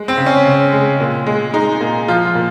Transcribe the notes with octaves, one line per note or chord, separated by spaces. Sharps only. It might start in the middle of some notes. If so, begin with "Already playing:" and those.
Already playing: G#3
C4
C#3
C#4
C#3
G#3
A#2
G#3
G#3 D#4
A#2
F3 F4
F4
A#2